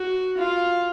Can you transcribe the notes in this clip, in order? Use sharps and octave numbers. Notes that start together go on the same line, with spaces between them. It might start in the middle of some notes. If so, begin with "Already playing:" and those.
Already playing: F#4
F4